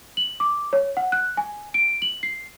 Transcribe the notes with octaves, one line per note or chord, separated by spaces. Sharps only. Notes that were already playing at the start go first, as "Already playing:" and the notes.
F#7
D6
C#5
F#5
F#6
G#5
D7
F#7
C7